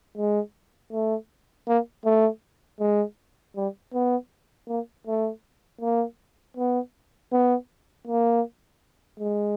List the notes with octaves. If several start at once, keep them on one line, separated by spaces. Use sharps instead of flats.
G#3
A3
A#3
A3
G#3
G3
B3
A#3
A3
A#3
B3
B3
A#3
G#3